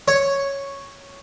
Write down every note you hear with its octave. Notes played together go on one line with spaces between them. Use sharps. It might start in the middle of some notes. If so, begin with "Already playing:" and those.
C#5